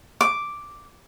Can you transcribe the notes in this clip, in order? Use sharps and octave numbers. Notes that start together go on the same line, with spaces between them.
D6